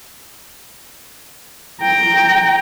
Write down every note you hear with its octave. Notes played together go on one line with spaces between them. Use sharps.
G5 A#5